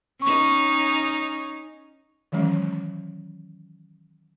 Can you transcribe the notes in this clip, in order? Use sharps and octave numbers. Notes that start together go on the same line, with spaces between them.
C#4 D#4 C#6
D#3 E3 F#3 G#3 C#4